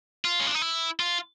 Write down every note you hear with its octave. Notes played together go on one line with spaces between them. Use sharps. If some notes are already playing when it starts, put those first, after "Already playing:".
F4
C#4
D4
D#4
E4
F4